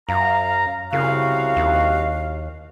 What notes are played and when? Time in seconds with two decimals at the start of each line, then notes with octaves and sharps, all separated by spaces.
0.09 F#2 F5 A#5
0.93 C2 C#3 F#4 F5
1.57 D#2